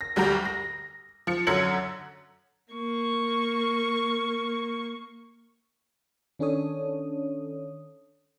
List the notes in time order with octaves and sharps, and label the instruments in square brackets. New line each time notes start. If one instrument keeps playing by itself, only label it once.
[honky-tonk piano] A#6
D2 G3 F#4 G4 A#5
A#6
F3 C#7
F#2 D3 F#3 G#6 C#7 F#7
[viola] A#3 C#6
[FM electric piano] D#3 C#4 D4 A4 C#5 D#6